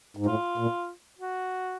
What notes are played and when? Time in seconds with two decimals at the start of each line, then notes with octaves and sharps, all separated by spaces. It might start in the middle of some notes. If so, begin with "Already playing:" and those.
0.17 G#2
0.26 A2 F4
0.58 A#2
1.19 F#4